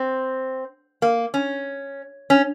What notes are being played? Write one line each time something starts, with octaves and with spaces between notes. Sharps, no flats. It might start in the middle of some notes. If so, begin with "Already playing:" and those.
Already playing: C4
A#3
C#4
C#4